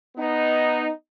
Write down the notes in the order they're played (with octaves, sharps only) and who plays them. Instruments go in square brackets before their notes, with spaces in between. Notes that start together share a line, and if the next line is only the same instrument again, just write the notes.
[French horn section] B3 D#4